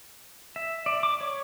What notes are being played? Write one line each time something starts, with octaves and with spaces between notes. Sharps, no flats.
E5
D5
D6
C#5